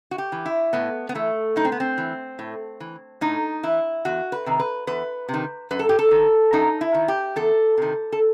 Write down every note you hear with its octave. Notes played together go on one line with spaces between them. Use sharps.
F#4
G4
E3
E4
A2 B3
B3
E3 A3
A2 D#4
C4
B3
C4
E3
A2
E3
A2 D#4
E3 E4
E2 F#4
B4
C3 D#3
B4
E2 B4
C3
D#3
F#2 B4
A4
G4
A4
D#3
F#2 D#4
E4
D#3
G4
E2 A4
C3 D#3
A4